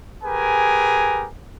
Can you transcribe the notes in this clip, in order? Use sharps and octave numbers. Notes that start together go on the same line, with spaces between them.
G4 G#4 A#4 B4 G#5